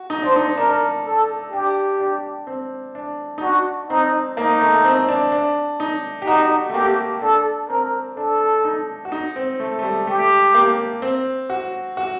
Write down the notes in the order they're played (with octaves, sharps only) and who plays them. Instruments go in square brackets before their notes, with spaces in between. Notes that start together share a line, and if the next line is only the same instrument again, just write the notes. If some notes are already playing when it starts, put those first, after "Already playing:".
Already playing: [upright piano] F#4
D#4
[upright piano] D4 [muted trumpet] C5
[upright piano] D#4
[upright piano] D4 [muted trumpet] A#4
[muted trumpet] A4
[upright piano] D4 [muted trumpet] G4
[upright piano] D4
C4
D4
D#4
[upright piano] D4 [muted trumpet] F#4
[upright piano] C4 [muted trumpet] D#4
[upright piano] A#3 [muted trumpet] D#4
[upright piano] A3
C4
D4
D4
D#4
G4
[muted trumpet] D#4 [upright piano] F#4
[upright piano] A3
[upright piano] A#3 [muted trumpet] G4
[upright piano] D4 [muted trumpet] A4
[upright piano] C4 [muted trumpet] A#4
[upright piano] D4 [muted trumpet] A4
[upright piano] D#4
F#4
D#4
C4
A3
A3
G3
[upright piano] A3 [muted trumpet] G4
[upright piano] A#3
C4
F#4
F#4